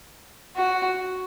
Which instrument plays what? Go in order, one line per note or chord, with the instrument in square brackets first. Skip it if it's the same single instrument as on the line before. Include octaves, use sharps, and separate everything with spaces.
[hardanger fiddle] F#4